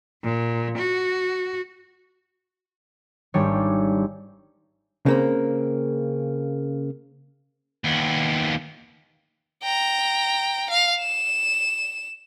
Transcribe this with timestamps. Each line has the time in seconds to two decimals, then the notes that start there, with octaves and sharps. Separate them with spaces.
0.23 A#2
0.78 F#4
3.34 G#1 G3 D4 C#5
5.06 C#3 A#3 C4
7.84 D#2 B3
9.63 G5 A#5
10.70 F5
11.00 E7